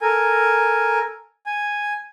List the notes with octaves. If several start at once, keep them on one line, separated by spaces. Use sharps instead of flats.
A4 A#4 G#5
G#5